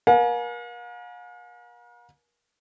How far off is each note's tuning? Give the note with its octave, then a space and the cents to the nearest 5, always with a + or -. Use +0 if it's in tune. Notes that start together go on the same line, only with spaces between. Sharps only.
A#4 +40 F5 +45 G#5 +25